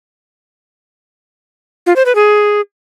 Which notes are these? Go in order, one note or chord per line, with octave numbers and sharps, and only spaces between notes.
F4
C5
B4
G#4